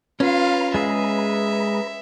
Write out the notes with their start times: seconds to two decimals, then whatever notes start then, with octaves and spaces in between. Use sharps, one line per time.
0.20 C#4 F4 B4 F5 A#5 B5
0.74 G#3 G#4 E5